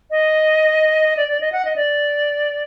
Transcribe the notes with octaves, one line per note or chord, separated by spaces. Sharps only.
D#5
D5
D5
D#5
F#5
D#5
D5